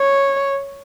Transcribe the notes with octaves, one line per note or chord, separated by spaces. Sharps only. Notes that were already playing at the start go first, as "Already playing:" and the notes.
Already playing: C#5